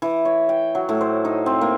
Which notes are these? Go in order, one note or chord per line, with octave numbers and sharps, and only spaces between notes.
E3
C#5
G5
F#3
A2
C5
D#4
C4
A#3